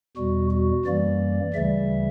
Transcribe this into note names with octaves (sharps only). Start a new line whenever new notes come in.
E2 B2 G3 F#4
F#4
F#2 E3 G3 A#3 D5
D2 C#3 E3 G3 E5